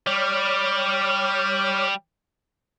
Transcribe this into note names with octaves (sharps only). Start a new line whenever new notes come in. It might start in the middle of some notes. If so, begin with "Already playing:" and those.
G3 C#5 D6 F6